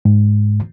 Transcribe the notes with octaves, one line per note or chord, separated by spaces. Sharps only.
G#2